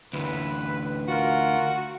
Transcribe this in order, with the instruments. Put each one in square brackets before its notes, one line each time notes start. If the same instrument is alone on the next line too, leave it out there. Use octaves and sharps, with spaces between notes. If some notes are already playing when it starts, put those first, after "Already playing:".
[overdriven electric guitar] D2 E3 [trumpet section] B4
[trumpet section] F4 A#4 [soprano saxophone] F#4